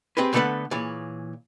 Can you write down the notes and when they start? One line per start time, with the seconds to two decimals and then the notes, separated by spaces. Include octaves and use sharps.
0.17 C4 G4 G#4 B4
0.33 D3 A3 B3 A4 B4 F#5
0.71 A#2 E3 G#4 C#5